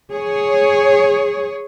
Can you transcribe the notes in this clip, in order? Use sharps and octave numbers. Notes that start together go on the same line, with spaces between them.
G#4 C#5